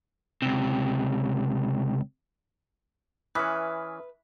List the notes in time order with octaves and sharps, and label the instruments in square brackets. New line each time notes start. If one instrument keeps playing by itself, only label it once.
[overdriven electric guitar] C#2 C3
[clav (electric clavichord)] E3 C#4 [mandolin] B4 [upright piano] E5 [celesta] D#6 F6 B6